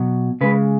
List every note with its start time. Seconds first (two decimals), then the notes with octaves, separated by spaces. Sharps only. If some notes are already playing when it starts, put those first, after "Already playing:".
Already playing: B2 F#3
0.41 C#3 G#3 B4